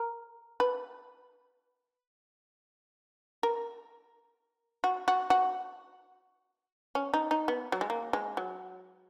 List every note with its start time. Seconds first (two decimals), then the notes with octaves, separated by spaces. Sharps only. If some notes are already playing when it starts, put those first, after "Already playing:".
Already playing: A#4
0.60 B4
3.43 A#4
4.84 F#4
5.08 F#4
5.30 F#4
6.95 C#4
7.14 D#4
7.31 D#4
7.48 B3
7.72 F#3
7.81 G#3
7.90 A#3
8.13 G#3
8.37 F#3